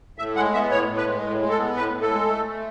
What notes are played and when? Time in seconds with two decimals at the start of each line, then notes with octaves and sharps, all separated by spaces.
0.18 A2 E5
0.36 G#3 F#5
0.54 B3 E5
0.71 A2 C#5
0.88 A2
0.97 B4
1.06 G#3
1.23 A2
1.40 G#3
1.50 A4
1.58 B3
1.75 A2 B4
1.93 A2
2.02 A4
2.11 G#3
2.28 A3
2.45 A3